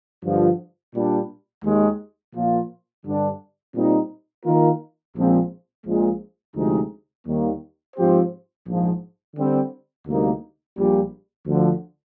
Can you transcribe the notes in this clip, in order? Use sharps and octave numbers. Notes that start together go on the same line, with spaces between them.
G2 D3 F3
A#2 G3 D4
D#2 D#3 G#3
A#2 F3 A#3 F4
G2 D3 G3 D4
A#2 G3 C4 D#4
D#3 A#3 F4 A#4
A#1 A#2 F3 G#3 C4
A#1 A#2 F3 G#3
D2 C3 F3 G#3 D#4
D#2 D#3 G3 A#3
G#2 F3 C4 G4 C5
A#1 G#2 F3
D3 G3 C4
D2 C3 G3 A#3 D#4
A#1 A#2 G3
D2 D3 F3